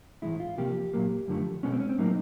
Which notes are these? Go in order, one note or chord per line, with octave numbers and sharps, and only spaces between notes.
G#2 E3 G#3 E4
F4
C3 F3 A#3 G4
A#2 F#3 A#3
F#2 D3 F3 A3
B2 G#3 B3 C#4
C4
C#4
C4
A2 F#3 A#3 D#4